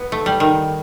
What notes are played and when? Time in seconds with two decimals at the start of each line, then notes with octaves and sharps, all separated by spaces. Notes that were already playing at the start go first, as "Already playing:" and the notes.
Already playing: B3
0.12 A3
0.26 G3
0.40 D#3